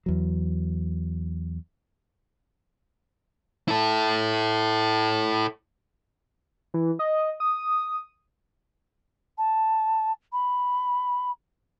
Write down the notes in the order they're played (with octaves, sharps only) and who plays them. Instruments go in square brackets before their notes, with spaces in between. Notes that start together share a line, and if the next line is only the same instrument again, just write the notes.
[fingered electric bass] E2 F#3
[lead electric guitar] E4 A4
[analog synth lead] E3
D#5
D#6
[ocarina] A5
B5